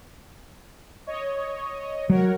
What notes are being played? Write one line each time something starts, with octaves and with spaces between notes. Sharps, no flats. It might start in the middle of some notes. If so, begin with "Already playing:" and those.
C#5 D#5
F#3 A#4 C#5 F#5